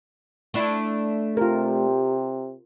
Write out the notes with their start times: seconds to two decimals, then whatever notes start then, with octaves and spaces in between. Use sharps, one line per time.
0.54 A3 D4 E4
1.37 C3 F4 G4 A#4